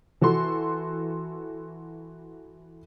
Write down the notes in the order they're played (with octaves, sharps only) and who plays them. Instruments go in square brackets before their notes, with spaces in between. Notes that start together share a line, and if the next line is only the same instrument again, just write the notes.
[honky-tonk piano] E3 F#4 A4 C6